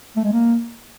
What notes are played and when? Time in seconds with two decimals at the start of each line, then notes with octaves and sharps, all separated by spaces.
0.16 A3
0.24 G#3
0.32 A#3